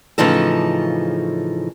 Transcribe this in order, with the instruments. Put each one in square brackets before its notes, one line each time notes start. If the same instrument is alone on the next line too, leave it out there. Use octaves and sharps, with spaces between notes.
[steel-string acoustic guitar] A2 C#3 E3 F3 D#4 A4